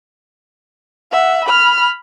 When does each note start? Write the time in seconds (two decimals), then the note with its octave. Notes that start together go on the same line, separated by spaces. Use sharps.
1.12 E5 F#5
1.45 B5 F6